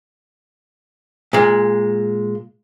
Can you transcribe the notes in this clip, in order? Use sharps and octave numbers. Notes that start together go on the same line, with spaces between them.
A#2 G#3